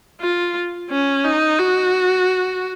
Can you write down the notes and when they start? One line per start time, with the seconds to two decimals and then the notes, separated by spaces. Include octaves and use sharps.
0.21 F4
0.90 C#4
1.24 D#4
1.59 F#4